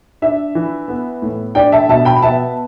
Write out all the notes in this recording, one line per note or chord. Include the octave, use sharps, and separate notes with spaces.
D4 E5
E3
B3
A2
D4 D5 G5
E5 A5
B2 E5 A5
G5 B5
B3 E5 A5